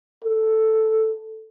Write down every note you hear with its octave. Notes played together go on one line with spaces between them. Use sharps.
A4